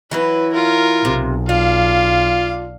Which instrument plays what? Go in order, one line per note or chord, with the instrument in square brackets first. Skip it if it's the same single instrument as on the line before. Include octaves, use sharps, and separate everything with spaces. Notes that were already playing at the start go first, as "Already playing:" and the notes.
[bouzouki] E3 F#3 E4 [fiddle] B4
[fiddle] F4 A#4
[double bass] B1 [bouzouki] C3
[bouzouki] D4 [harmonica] F4 [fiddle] F5